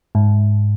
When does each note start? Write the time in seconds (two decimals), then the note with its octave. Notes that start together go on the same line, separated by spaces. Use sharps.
0.15 G#2